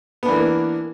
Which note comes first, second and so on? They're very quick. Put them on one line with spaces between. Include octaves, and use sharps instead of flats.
B3 D4 E3 A#3